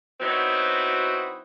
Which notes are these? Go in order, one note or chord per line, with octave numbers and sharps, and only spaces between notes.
F#3 B3 C4 D#4 E4 F#4